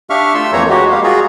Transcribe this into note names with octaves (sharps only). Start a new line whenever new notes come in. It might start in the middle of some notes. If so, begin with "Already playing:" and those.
D4 G4 E5 F5 C#6 F6
A3 F4 C6 E6
F2 E3 A3 A#3 C#5 A#5
G#3 F#4 G4
G3 G#3 A#3 F5
F4 F#4 G#4 A#5